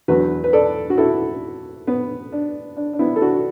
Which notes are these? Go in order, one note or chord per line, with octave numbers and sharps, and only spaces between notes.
E2 D3 F#3 F#4 B4
B4
A4 D5
F#4
E4 A4
B3
D4
D4
D4
B3 E4
A4
D4 F#4